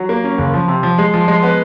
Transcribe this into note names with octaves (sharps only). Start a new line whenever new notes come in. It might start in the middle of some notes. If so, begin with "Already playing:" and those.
Already playing: F#3
A#3
C#4
F#1
F3
C3
F3
G#3
F3
G#3
B3